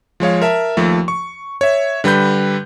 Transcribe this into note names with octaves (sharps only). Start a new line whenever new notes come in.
F3 G#3 C#5 F5
A#4 E5 A5
D#2 F3 A3
C#6
C#5 E5
D3 G3 B4 B5 G6